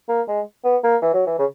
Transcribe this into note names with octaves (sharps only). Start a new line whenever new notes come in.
A#3
G#3
B3
A#3
E3
F#3
E3
C#3